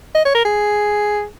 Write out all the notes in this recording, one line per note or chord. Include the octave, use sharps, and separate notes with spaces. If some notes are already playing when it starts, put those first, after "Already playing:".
D#5
C#5
A#4
G#4